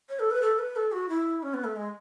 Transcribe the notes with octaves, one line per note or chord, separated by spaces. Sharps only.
C#5
A4
B4
A4
B4
A4
F#4
E4
C#4
B3
A3
G#3